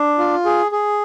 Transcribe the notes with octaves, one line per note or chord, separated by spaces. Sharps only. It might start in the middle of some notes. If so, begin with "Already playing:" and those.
Already playing: D4
F4
G#4
G#4